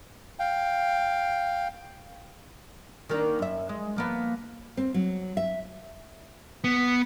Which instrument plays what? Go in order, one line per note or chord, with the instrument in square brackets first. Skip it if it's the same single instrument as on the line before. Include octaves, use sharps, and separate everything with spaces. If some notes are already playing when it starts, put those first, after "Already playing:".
[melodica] F5 G5
[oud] D#3 A#3 D4
F#2 E5
G#3
F3 A#3 B3
[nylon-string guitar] C4
F#3
E5
[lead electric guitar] B3